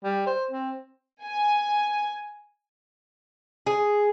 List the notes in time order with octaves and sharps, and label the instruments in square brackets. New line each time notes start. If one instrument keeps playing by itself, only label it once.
[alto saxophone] G3
C5
C4
[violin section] G#5
[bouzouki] G#4